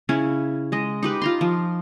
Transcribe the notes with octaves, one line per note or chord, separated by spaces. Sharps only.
C#3 C#4 E4
G#3 D#5
D#4 G4 B4
F4 A#5 C6
F3